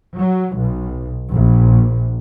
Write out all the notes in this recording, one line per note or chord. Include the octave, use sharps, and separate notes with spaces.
F#3
B1
A#1